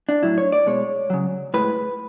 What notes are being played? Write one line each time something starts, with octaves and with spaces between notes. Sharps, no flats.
D4
A2 F#3 E4
C#5
D5
B2 G#3 C#5
C#3 F#3
A2 G#3 B4